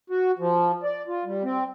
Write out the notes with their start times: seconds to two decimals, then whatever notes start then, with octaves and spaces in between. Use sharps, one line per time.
0.10 F#4
0.39 F3
0.84 D5
1.08 F4
1.25 G3
1.43 C4